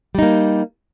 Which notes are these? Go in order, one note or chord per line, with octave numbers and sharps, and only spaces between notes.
G3 A#3 D#4